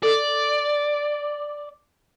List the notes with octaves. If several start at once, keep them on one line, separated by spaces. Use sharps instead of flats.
A4 D5 D#5